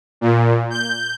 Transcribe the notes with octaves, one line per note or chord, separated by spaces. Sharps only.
A#2
G6